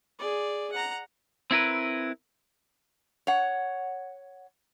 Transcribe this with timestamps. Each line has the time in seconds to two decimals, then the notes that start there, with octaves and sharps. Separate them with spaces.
0.19 G#4 D5
0.73 F#5 A#5
1.51 C4 E4 A#4 B4
3.27 C#5 F#5